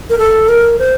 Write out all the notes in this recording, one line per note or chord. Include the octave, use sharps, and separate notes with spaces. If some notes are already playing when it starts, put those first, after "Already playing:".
A#4
A4
A#4
C5